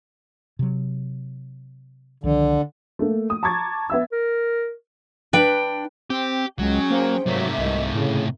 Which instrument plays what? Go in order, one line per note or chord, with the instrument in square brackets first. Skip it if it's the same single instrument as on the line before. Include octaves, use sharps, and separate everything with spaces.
[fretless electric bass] C3 F#3
[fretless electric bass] C2 D#3 F3 [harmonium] D3
[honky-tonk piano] A3 A#3
D#6
A5 A#5 C#6 D6 G#6 A6
B3 E5 E6
[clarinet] A#4
[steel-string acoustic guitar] D4 G5 [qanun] B4
[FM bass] C4 [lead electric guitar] G4
[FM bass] C#2 [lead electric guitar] F#3 [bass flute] G#3 [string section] C#4 G#4 G5
[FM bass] A#3 [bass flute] C5
[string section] G#2 A#3 E5 [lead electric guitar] C3 A3 [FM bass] F#3
[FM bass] C2 [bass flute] D#5
[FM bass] A2 [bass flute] C#3